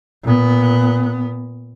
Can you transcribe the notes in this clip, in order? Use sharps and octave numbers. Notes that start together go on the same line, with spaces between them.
A#2 B3